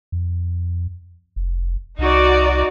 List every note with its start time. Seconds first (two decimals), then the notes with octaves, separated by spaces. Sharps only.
0.12 F2
1.36 F1
1.99 C2 D#4 F#4 D5